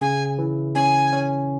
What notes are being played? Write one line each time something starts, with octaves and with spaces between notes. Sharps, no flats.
C#3 G#5
E3
C#4 G#5
C#4